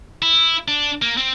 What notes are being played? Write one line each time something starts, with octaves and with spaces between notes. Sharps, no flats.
E4
D4
A#3
C4